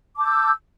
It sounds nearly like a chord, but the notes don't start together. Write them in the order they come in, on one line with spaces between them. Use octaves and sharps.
D6 A5 G6 E6